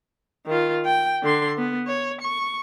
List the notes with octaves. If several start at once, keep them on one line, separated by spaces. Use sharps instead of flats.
D#3 F4
G5
D3 C6
B3
C#5
C#6